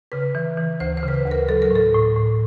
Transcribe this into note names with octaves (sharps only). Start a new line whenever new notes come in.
C#3 B4
E3
E3
D2 C5
C5
C#3 B4
C5
D2 B4
A#4
F#3 A4
A#4
A2 A4
A2
A2